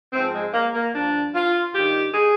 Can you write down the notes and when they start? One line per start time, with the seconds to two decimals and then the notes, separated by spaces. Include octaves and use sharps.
0.13 G#2 F3 C4
0.35 G#3
0.54 A#3
0.74 A#3
0.94 G2 F3 D4
1.34 F4
1.75 G2 D#3 G4
2.15 G#4